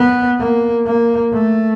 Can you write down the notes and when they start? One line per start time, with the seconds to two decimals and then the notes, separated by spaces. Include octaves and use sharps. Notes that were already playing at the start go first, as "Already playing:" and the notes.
Already playing: B3
0.40 A#3
0.86 A#3
1.33 A3